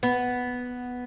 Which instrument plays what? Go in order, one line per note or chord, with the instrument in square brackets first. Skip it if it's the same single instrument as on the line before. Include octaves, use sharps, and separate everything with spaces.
[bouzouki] B3